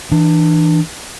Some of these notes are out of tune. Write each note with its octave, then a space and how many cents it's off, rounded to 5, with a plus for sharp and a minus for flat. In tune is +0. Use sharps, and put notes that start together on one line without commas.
E3 -15 D4 +25